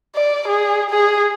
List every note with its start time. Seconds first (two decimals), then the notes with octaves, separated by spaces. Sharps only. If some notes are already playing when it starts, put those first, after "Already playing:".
0.16 D5
0.48 G#4
0.90 G#4